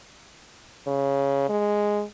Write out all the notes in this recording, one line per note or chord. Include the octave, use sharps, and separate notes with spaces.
C#3
G#3